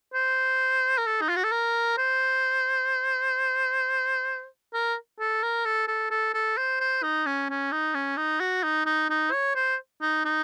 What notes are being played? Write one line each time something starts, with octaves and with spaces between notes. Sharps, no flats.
C5
A#4
A4
D#4
F4
F#4
A4
A#4
C5
A#4
A4
A#4
A4
A4
A4
A4
C5
C5
D#4
C#4
C#4
D#4
C#4
D#4
F#4
D#4
D#4
D#4
C#5
C5
D#4
D#4